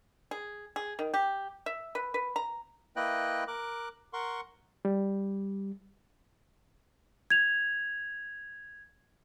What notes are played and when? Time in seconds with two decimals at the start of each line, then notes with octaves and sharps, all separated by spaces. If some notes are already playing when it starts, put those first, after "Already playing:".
0.31 G#4
0.76 G#4
0.99 D#3
1.14 G4
1.66 E5
1.95 B4
2.14 B4
2.36 A#5
2.96 A#3 E4 B4 D#5 G5 F#6
3.48 A#4 D6 F#6
4.13 A#4 F#5 C6 C#6
4.85 G3
7.30 G#6 F7